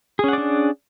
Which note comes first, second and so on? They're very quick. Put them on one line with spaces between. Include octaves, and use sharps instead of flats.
G#4 C#4 F#5 D5 D4